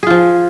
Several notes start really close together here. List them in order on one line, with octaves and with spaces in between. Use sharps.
G#4 F4 F3